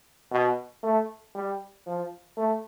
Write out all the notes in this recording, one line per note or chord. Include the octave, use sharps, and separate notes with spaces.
B2
A3
G3
F3
A3